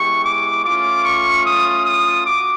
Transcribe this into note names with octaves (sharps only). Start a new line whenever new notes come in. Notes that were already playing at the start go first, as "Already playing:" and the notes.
Already playing: G#3 B3 E4 G4 C#6
D6
A3 C#4 F4 D6
C#6
D#6
D#6
F#4 D6